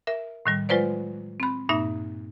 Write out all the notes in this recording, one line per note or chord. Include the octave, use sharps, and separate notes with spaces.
A#4 E5
A2 D#3 G3
F#3 G#3 F4 B4 C5 D5
C4 B5
G2 A#2 A#3 D#4 E5